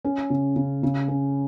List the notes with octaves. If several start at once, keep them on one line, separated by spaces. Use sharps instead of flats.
C#4
C#3
C#3
C#3
C#4